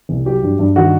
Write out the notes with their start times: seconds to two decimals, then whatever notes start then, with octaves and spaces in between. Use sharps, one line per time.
0.09 C2
0.25 F#3 G4
0.43 G2
0.59 G2
0.76 D#3 F#4